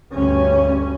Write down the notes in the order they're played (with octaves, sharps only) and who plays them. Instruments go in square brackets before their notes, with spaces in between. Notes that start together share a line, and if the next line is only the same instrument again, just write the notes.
[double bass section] D2 G2 C#4